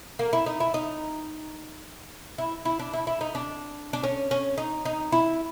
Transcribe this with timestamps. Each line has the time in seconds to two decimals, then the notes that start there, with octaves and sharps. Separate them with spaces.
0.19 A#3
0.33 E4
0.46 D#4
0.60 E4
0.74 D#4
2.38 E4
2.65 E4
2.79 D4
2.93 E4
3.07 E4
3.21 D#4
3.35 D4
3.93 D4
4.04 C#4
4.31 C#4
4.58 D#4
4.85 D#4
5.12 E4